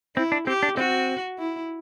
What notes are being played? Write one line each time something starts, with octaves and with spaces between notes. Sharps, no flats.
C4 E4
D4
C4 G4
D4
C4 F#4
E4